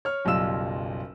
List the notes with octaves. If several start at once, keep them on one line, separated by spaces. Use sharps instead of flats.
C#5 F6
F#1 B1 G3 F4 E6 E7